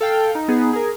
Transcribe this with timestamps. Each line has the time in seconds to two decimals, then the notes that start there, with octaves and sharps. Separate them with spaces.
0.01 A4 F5 G5
0.35 D#4
0.48 B3 D#4 G#4
0.73 G#4 A#4